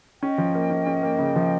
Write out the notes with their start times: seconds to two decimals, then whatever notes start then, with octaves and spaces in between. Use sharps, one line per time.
0.23 C#4 D#5 G5
0.38 F3
0.55 A#3
0.70 C#4
0.87 C#4
1.03 A#3
1.19 C#3
1.36 F3